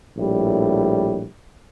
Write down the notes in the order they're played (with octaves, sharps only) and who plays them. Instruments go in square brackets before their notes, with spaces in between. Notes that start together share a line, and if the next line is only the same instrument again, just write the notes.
[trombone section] A#1 A2 G3